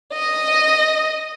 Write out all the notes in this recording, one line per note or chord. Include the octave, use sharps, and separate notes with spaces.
D#5